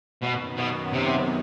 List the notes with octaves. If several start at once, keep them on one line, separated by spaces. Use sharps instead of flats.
F#2 B2 D#3 F#3 B3
B2
C3